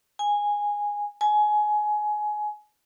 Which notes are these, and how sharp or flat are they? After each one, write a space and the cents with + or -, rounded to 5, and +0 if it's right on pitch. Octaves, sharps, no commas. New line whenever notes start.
G#5 -10
G#5 +20